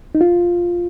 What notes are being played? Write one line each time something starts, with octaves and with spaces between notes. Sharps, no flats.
D#4
F4